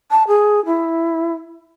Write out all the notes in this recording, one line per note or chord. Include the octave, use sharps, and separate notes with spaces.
A5
G#4
E4